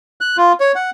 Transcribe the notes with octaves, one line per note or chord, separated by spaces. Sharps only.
F#6
F4
C#5
F#5